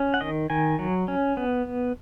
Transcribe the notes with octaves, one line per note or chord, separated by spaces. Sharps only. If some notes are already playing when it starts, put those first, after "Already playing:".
Already playing: C#4
F#5
D#3 D#5
D#3 G#5
F#3
C#4
B3